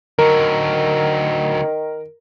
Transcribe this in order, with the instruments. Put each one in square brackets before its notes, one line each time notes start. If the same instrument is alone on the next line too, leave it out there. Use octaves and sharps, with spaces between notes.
[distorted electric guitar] D3 F#3 [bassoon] D#3 [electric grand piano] A#4